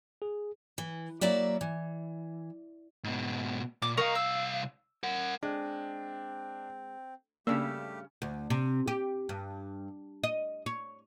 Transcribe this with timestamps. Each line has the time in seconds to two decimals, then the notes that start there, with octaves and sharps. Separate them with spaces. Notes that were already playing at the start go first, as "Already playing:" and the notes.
0.22 G#4
0.78 E3
1.21 F#3 A#3 E4 D5 E5
1.61 E3
3.04 G#2 B2
3.82 A#2 D6
3.97 C2 A#4 D#5 F5 C#6
4.15 E6
5.04 A#4 F#5
5.43 G#3 C4 D4
7.47 G2 C#3 G3 A3 A#3 D4 G4 E6
8.22 D2
8.50 C3
8.88 G4
9.29 G2
10.24 D#5
10.66 C#5